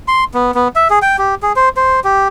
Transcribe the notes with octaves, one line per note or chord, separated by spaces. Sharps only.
C6
B3
B3
E5
G#4
G5
G4
G#4
C5
C5
G4